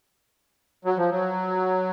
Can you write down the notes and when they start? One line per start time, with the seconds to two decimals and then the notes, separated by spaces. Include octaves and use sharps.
0.85 F#3
0.97 F3
1.10 F#3